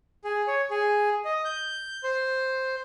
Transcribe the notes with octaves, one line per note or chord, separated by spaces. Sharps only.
G#4
C#5
G#4
D#5
G6
C5